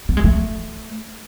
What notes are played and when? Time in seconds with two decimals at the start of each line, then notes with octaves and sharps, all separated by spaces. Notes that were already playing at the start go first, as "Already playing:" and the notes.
0.09 B3
0.17 G#3
0.24 A3